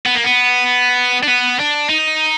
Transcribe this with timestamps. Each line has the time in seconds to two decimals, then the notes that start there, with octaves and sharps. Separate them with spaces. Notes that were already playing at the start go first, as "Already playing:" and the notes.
0.06 B3
0.15 A#3
0.24 B3
1.23 D4
1.28 B3
1.59 D4
1.90 D#4